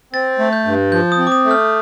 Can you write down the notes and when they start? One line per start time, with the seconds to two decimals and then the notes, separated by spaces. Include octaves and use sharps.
0.13 C4 A6
0.39 A3
0.53 G6
0.65 G2
0.91 F3 G6
1.12 D#6
1.18 C4
1.27 D6
1.32 D#6
1.45 A3
1.51 F6